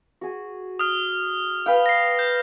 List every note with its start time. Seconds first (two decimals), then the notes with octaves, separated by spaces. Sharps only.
0.21 F#4 G#4
0.79 D#6 F6
1.66 B4 F5 G5
1.86 A#6 C7
2.19 G6